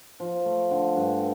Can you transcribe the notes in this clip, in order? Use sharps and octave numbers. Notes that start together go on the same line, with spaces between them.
F3
A3
D3
G2